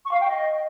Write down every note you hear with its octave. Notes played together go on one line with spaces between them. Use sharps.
C#6
F5
G5
D#5